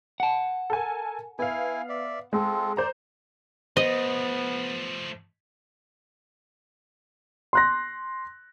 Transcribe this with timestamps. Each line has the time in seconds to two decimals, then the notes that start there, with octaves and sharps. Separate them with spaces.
0.20 F#5 A5
0.70 A4 A#4 G#5
1.39 B3 E4 F5 G#5
1.89 D5 E5
2.33 G#3 C4 F4 A4
2.77 C5 D5 A#5
3.77 F3 A3 B3 C5 D#5
7.53 C6 F#6 A#6